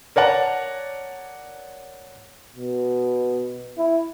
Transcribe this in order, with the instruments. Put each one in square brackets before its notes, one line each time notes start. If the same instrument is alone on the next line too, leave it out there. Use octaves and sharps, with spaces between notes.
[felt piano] A#4 C#5 D5 F#5 A5
[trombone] B2
E4